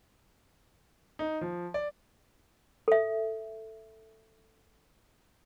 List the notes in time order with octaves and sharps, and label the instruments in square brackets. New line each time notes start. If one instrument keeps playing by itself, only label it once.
[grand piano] D#4
F3
D5
[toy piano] A4 E5